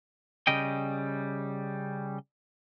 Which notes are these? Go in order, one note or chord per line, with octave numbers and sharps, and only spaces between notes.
C#3 G3 D#5 G5